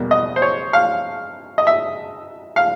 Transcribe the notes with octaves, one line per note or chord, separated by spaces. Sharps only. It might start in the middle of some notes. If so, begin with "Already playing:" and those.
Already playing: E2 B2 G3 A#3
D#5
C5
C#5
F5
D#5
E5
F5